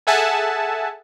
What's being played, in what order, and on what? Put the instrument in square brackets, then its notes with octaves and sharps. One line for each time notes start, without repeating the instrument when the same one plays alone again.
[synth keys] G#4 A4 E5 F#5 G#5 A5